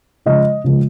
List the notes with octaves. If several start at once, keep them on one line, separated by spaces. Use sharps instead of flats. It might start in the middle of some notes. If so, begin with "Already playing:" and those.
C#3 F3 G#3 D#5
C#3 F3 G#3